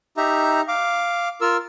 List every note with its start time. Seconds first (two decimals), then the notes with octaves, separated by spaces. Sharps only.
0.17 D#4 G4 E5 A#5
0.68 F5 D6
1.41 F4 A#4 E6